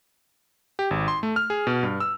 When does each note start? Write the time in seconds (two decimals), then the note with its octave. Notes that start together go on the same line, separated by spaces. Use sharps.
0.79 G4
0.91 G#1
1.08 C6
1.23 A3
1.36 F6
1.50 G#4
1.67 B2
1.83 G2
2.00 E6